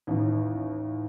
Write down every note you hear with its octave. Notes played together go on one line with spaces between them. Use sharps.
A1 D#2